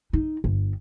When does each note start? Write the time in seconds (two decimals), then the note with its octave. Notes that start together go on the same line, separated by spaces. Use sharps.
0.13 D#4
0.44 G1